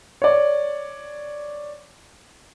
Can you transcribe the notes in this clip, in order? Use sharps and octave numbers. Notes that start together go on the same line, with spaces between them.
C#5 D5